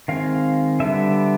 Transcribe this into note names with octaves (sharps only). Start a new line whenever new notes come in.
D#3 G#3 C4 F5
D3 G3 B3 E5